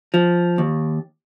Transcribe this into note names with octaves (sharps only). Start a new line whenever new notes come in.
F3
D#2